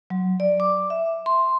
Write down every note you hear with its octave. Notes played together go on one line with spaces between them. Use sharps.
F#3
D5
D6
E5
C6